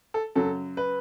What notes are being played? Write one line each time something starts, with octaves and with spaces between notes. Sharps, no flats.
A4
F#2 C#3 F#3 A4
B4